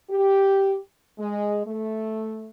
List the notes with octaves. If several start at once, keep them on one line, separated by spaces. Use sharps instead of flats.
G4
G#3
A3